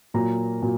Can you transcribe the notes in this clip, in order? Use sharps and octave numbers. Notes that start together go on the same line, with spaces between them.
A#2 F#3 A#3 A#5
A#2 F#3 A#3